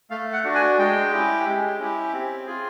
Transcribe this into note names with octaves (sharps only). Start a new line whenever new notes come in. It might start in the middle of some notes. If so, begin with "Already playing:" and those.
A3 F5
F#5
D4 F#4
G#5
G#3 G5
C#4 E4 G4
G#3
C#4 E4 G4
C4
F4 G#4